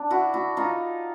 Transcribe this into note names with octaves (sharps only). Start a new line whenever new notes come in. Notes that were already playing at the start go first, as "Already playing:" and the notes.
Already playing: D4
E4 F#4
E4 F#4
D#4 F4